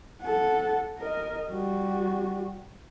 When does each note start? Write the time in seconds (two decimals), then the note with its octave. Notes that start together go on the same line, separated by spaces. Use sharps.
0.23 A4 F#5
0.98 A#4 D#5
1.51 G3 F#4